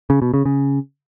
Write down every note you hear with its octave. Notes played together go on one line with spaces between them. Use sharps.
C#3
B2
C#3
C#3